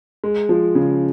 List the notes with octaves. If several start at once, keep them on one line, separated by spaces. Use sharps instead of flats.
G#3
F3
C#3